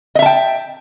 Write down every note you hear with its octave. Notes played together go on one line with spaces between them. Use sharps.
D#5 E5 G5 A5